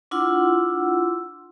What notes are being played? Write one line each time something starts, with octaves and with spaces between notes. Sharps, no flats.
D4 E4 F4 F#5 C6 E6